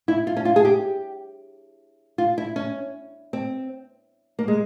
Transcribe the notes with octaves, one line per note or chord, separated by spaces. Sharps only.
E4
F4
C#4
F4
G#4
G4
F4
E4
C#4
C4
A#3
G#3